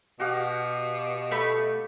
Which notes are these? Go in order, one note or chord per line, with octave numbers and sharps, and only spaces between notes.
B2 F#4 G4 F5
A3 B5